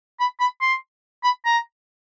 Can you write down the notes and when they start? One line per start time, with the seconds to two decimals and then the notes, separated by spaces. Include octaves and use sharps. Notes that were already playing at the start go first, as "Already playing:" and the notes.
0.20 B5
0.40 B5
0.61 C6
1.23 B5
1.45 A#5